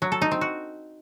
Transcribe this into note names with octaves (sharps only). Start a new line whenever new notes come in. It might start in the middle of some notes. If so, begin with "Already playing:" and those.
F#3
A4
D#4
C4
F#4